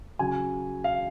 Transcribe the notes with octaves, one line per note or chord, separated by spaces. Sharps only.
C#3 F#3 G#5
F5